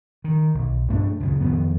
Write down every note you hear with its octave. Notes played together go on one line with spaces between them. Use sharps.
D#3
B1
G2 A3 D4
C#2 F#2 C#3
F2 D#3 B3